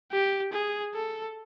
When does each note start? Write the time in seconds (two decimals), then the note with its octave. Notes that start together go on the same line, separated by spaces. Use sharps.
0.12 G4
0.52 G#4
0.95 A4